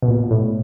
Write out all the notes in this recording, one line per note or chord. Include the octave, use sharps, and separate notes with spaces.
B2
A#2
A2